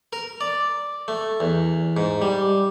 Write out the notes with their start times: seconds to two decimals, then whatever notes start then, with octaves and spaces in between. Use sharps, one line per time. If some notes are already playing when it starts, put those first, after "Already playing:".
0.13 A#4
0.41 D5
1.08 A3
1.40 E2
1.97 G#2
2.22 G3